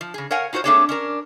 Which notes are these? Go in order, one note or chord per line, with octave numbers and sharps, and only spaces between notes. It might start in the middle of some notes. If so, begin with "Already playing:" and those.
F3
C#3 G#4
A#4 C#5 F5 F#5 G#5
D#4 F4 F#4 B4 C5
A3 A#3 C4 D4 G#4 C#5
C#4 D4 A#4